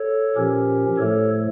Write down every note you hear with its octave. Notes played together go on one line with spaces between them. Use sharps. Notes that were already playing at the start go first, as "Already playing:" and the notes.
Already playing: A4 C#5
A#2 F3 C#4 G4 A#4
A2 F3 A3 A4 C#5